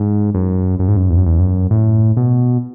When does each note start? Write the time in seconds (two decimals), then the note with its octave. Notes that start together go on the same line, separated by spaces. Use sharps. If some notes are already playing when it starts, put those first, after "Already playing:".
Already playing: G#2
0.34 F#2
0.79 F#2
0.88 G#2
0.97 F#2
1.10 E2
1.17 F#2
1.26 E2
1.40 F#2
1.71 A2
2.17 B2